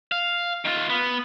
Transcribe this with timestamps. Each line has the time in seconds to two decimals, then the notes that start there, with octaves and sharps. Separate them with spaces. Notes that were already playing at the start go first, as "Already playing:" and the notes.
0.12 F5
0.65 D#3 F4
0.90 B3